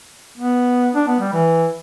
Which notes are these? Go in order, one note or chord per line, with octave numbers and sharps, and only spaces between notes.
B3
D4
B3
G3
E3